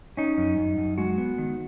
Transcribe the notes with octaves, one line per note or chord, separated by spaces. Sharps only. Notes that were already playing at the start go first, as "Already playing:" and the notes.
C#4 D#4
F#2
F#2
F#2
G#3 F#4
B3
D#3